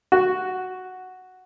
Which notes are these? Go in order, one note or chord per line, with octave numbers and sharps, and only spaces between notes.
F#4